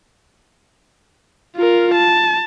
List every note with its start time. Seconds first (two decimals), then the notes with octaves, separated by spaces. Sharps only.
1.56 F4 A#4
1.94 A5